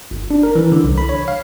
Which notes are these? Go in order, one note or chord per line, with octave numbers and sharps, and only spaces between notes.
G1
D4
A#4
E3
D3
C2
B5
C#5
F5